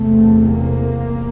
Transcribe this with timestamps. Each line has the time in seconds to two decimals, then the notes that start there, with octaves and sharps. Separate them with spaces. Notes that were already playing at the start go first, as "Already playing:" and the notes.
Already playing: E2 C3 A3
0.50 A#3